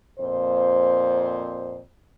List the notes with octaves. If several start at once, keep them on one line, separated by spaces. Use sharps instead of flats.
F2 A#2 C5